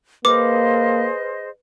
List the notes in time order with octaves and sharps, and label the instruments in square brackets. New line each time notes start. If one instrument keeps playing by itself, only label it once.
[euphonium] A#3 [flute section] G#4 C5 D#5 [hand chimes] B4 [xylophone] D6